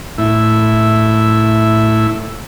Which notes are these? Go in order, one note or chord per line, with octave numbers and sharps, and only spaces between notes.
A2 E4